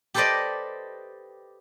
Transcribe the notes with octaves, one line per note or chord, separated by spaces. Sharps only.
G4 A4 B4 C5 D5 D#5